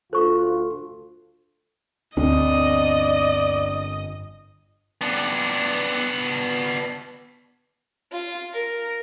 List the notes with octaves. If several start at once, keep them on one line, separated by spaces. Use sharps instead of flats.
D2 F4 A4 C5 C#6
G1 D2 C4 D4 D5 D#5
B3 D4
F4
A#4